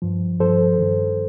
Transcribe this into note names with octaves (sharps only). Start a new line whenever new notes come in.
G2 F3
G2 F3 A4 C5
G2 D#3